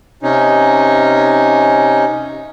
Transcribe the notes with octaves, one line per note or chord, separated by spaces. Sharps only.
C3 C#4 D#4